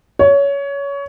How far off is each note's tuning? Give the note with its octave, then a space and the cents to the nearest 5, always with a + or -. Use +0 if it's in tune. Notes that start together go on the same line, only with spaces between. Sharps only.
C#5 +20